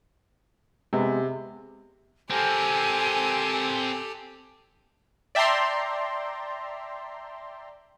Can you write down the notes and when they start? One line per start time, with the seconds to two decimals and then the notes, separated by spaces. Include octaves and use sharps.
0.93 C3 G#3 B3
2.30 C4 G4 A4 A#4 G#5
5.35 D5 E5 G5 A5 A#5 C6